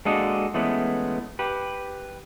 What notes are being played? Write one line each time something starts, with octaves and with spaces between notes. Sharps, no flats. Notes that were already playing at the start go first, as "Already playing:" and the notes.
G#3 A#3 D4 F#4 A4 D#5
E3 G#3 A3 B3 C#4
G4 B4